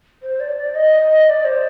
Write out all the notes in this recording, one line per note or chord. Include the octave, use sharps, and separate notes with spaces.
C5
D5
D5
D#5
D5
C5